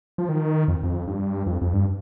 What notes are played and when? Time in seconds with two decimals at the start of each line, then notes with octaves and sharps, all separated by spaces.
0.18 F3
0.29 D#3
0.68 F2
0.83 F2
1.08 G2
1.46 F2
1.61 F2
1.73 G2